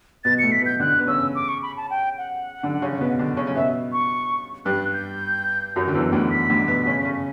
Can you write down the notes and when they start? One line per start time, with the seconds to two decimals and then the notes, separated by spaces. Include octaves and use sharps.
0.24 B2 B3 A6
0.39 A2 A3 C#7
0.52 B6
0.61 B2 B3 G6
0.80 D3 D4 F#6
0.99 B3
1.07 C#3 C#4 E6
1.35 D6
1.48 C#6
1.63 B5
1.77 A5
1.90 G5
2.18 F#5
2.63 D3 D4
2.82 C#3 C#4
3.01 B2 B3
3.19 D3 D4
3.37 C#3 C#4
3.47 C#4
3.55 B2 B3 E5
3.92 C#6
4.65 G2 G3 F#6
4.94 G6
5.76 F#2 F#3
5.88 D3
5.95 E2 E3
6.12 D2 D3
6.31 B6
6.50 D2 D3
6.67 B2 B3
6.86 C#3 C#4
7.04 C#3 C#4